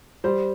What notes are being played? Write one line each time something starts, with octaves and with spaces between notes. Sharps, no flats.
G3 C5